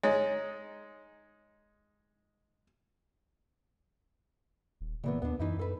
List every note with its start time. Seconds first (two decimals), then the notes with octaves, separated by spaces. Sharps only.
0.03 G#3 D#4 C#5
4.81 D#1
5.04 A#2 C#3 E3 B3
5.22 D#2 B3 D4
5.39 F#2 E3 D#4 E4
5.59 A4 B4